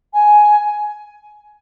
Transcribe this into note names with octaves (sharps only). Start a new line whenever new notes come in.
G#5